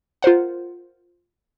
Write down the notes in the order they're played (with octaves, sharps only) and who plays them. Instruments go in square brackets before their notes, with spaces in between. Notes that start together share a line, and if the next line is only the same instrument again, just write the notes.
[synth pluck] F4 A#4 C5 F#5